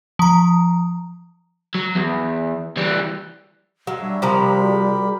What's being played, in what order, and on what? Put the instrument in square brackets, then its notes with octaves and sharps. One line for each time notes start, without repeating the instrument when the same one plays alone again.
[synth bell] F3 A#5
[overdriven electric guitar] F#3
E2
E3 G3
[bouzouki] F#3 [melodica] G#3 F5
[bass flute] G3 [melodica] D4 C#5 E5
[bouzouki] C3 F3 A#5 [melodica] G4 A#4 B5 [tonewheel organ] C5 G5
[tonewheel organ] F#4 G#4 D5